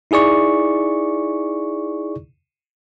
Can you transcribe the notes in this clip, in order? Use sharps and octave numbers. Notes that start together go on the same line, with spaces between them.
D#4 E4 G#4 D5 C#6